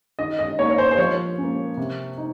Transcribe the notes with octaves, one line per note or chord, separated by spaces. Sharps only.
D#3 D#5
D#5
A#3 D#4 C#5
C#5
C5
C5
F3 C#5
A#3 C#4
C3
D#4